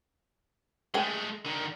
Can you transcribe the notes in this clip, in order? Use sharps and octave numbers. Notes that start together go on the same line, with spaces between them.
G#3 A3 G#4 G5
D3 D#3